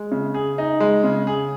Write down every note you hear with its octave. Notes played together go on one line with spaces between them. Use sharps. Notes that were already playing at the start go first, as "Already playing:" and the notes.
Already playing: G#3
C#3
G#4
D#4
G#3
C#3
G#4